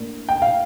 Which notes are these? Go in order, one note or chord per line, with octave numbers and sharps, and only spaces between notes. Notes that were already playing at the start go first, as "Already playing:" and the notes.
Already playing: A2 A#3 D4
G5
F5